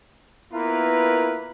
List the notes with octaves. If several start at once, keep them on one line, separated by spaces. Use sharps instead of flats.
A#3 B3 E4 F4 A#4 B4